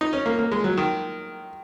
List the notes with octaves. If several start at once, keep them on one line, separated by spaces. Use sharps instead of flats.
D#4
C#4
A#3
A#3
G#3
F#3
D#3